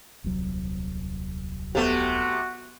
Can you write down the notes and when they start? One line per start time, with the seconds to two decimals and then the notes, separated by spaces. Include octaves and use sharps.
0.24 D#1 C2 F#3
1.75 C3 A3 B3 F#4 G4